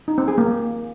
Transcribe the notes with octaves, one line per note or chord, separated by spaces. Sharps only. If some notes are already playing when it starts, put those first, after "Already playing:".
D#4
C4
G#4
A#3